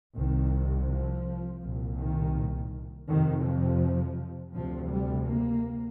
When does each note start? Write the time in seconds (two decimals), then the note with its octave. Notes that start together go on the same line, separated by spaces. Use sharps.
0.15 C2 C3 D#3
0.88 F3
1.61 C2 A#2
1.98 D#3
3.07 F2 C3 D#3
3.44 F3
4.54 D2 C3 F3
4.90 G3
5.26 A#3